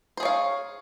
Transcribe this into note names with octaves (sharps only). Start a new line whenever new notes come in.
G#4 C5 C#5 F5